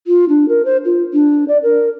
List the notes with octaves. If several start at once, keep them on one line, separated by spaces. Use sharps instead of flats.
F4
D4
A#4
C5
F4
D4
D5
A#4